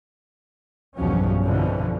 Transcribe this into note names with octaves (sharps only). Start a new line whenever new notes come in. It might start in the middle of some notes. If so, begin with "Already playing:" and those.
B1 E2 G2 F3 F#3 C#4
F2 B2 D3 E3 F3